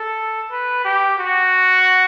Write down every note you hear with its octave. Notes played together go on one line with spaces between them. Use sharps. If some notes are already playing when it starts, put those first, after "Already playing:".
Already playing: A4
B4
G4
F#4